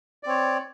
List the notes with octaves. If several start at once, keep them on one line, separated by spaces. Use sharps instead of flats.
C4 C#5 D5